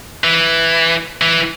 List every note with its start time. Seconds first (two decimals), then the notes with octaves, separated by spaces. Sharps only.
0.24 E3
1.22 E3